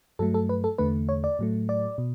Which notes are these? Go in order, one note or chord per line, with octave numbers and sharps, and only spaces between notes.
G2 F#3 A3 A4
A4
B4
A4
E2 D3 A3 B4
C#5
D5
A2 F#3 A3
D5
B2